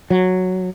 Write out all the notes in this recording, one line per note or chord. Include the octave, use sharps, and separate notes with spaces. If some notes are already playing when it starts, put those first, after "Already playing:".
F#3